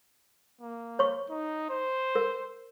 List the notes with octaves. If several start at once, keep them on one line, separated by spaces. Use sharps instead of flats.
A#3
C#5 C#6
D#4
C5
A#4